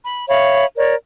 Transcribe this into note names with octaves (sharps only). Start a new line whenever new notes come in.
B5
C#5 E5 F5 B5
A#4 C#5 D5